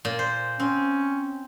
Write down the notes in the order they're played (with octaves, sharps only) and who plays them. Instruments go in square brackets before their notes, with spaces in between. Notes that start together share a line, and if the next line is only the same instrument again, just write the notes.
[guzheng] A#2
C5
[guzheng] C4 [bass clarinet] C#4